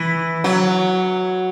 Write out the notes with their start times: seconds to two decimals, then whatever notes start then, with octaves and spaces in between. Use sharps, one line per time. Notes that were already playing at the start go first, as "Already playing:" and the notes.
Already playing: E3
0.44 F#3